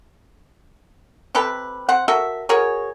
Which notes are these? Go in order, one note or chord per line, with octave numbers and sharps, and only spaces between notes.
C3 G4 A4 B4
C4 F#5
F#4 A4 A#4 E5
F#4 G#4 A#4 C#5